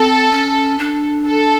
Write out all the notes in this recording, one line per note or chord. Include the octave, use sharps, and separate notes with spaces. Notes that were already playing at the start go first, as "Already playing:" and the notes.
Already playing: C4 A4
C#4
D4
A4